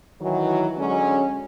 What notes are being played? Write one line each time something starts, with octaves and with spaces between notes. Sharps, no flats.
D#3 E3 F#3
D3 F#3 G#3 C#4